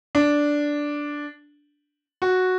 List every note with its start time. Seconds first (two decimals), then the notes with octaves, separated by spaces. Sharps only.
0.15 D4
2.22 F#4